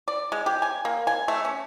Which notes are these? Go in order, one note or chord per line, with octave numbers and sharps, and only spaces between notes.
D5
G#3
G4
G#5
A#3
G#5
A3
C#4